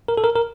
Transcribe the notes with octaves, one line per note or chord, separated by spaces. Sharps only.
A#4
A4
A#4
A#4